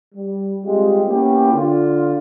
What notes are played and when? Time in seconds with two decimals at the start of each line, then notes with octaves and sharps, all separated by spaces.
0.15 G3
0.65 G3 G#3 C4 F4 G4
1.08 A#3 B3 C#4 E4 G4
1.53 D3 F4